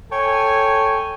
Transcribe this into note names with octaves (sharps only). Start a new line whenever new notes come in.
A4 C#5 G5 G#5